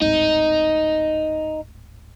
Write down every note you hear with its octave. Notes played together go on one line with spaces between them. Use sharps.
D1 G#1 D#4